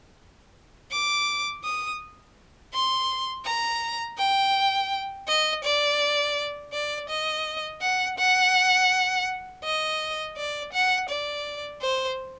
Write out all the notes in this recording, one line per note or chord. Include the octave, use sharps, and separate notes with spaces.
D6
D#6
C6
A#5
G5
D#5
D5
D5
D#5
F#5
F#5
D#5
D5
F#5
D5
C5